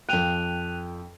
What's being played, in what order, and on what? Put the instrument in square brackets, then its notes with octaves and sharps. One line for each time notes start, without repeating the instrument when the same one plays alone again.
[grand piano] F2 G5 [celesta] F#6 D#7 F7